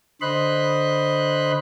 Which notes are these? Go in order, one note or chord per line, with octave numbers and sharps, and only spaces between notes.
D3 C5 D#5 B5 C6 F#6